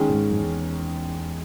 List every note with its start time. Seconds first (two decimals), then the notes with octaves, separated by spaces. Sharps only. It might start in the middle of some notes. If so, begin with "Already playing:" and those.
Already playing: D#3 G#3 C#4
0.09 A#2
0.14 G#2
0.31 F#2
0.40 E2